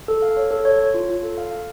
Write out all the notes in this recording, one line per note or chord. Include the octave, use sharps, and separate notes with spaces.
A4
F5
C#5
A4
C#5
C#5
F4
F4
A4
F5
F5